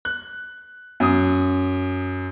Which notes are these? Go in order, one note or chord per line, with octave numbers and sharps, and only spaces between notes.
F#6
F#2 D#6